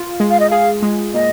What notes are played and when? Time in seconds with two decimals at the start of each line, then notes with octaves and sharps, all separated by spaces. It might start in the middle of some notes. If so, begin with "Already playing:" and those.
Already playing: F4
0.20 G#3
0.30 F5
0.40 D#5
0.50 G#4 F5
0.82 G#3
1.14 A#2 D#5